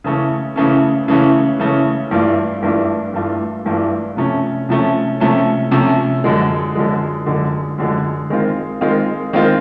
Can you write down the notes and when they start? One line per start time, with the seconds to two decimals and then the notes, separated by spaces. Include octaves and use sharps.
0.04 C#3 E3 A3 C#4
0.56 C#3 E3 A3 C#4
1.08 C#3 E3 A3 C#4
1.59 C#3 E3 A3 C#4
2.11 G2 E3 A3 D4 F4
2.62 G2 E3 A3 D4 F4
3.14 G2 E3 A3 D4 F4
3.66 G2 E3 A3 D4 F4
4.17 C3 F3 A3 C#4
4.69 C3 F3 A3 C#4
5.20 C3 F3 A3 C#4
5.71 C3 F3 A3 C#4
6.24 F#2 D3 F3 G#3
6.75 F#2 D3 F3 G#3
7.26 F#2 D3 F3 G#3
7.78 F#2 D3 F3 G#3
8.30 D#3 G#3 C4 F4
8.81 D#3 G#3 C4 F4
9.33 D#3 G#3 C4 F4